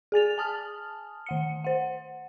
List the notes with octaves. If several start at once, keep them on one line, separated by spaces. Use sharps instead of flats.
G#4 G#5 A6 F7
G#5 A5 D#6 F6
D#3 F#5 C#7
C5 F#5